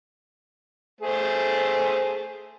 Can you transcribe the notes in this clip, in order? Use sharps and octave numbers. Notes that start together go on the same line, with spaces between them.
A3 G#4 C5